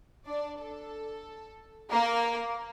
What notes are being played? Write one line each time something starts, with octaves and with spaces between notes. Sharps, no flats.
D4 D5
A4
A#3 A#4